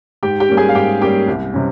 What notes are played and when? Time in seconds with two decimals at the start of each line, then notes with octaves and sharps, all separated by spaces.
0.23 G#2 G4 G5
0.40 G4 G5
0.49 G3 A#3 C#4
0.57 G#4 G#5
0.69 F5
0.75 G#2 G4 G5
1.01 G3 A#3 C#4 G4 G5
1.27 C2
1.54 C3 G3 C#4